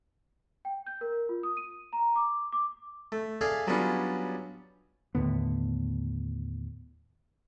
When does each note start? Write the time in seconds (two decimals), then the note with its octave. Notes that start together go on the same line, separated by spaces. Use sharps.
0.65 G5
0.86 G6
1.01 A#4
1.29 F4
1.43 D#6
1.57 D#7
1.93 A#5
2.16 D6
2.53 D6
3.12 A3
3.41 G#4 A4 D5 E5 F5 G#5
3.67 F#3 G3 B3 C#4 D4 F4
5.15 D#2 A2 D3 B3